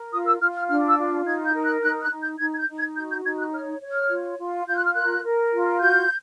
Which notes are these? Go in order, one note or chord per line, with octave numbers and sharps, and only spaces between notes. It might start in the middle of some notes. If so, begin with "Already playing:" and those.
Already playing: A#4
F4 D#6
E6
F4 F6
F6
D4 F6
E6
F4
D#4 G#6
G6
A#4
F#6
D#4 F#6
F#6
D#4
G6
D#4 G#6
G#6
G6
D#4
G#6
F#4 G6
G6
D#4 G#6
F#6
C#5 F6
C#5
F6
F4
F4
F4 G6
F#6
F6
A#4 F#6
A#4
F4
F#4 G6